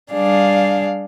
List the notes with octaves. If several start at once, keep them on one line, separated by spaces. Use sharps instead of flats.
G3 D4 G#4 D5 F5